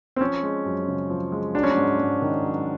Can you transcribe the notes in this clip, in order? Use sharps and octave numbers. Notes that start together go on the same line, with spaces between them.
C4
F3 C#4
G#3
F#2
C#3
F3
G#3
F#3 D4
C#4
D4
G#2
G#2
D#3
F#3